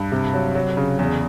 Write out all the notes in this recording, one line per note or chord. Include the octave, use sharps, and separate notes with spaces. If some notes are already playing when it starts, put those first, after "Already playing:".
Already playing: G2
C3
F#3
F#3
C#3
E2